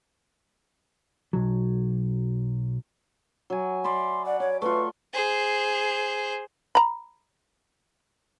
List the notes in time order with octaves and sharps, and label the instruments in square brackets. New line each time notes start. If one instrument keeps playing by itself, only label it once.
[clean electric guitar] B1 F#3
[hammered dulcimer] F#3 G#5
[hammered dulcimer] D5 E5 B5 [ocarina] C6
[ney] D5 [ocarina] F#5
[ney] C#5 [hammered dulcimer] D6
[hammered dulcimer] A3 F4 [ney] B4 [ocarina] C#6
[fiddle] G#4 C5
[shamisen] A#5 B5